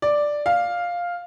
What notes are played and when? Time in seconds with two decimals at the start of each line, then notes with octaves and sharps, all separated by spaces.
0.02 D5
0.46 F5